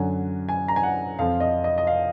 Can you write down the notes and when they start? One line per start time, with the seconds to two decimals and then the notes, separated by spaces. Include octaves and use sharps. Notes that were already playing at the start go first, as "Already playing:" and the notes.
Already playing: F#2 D3 F#3 G#5
0.49 G#5
0.68 A#5
0.76 G#5
0.83 F#5
1.19 F2 F3 F5
1.40 D#5
1.64 D#5
1.78 D#5
1.87 F5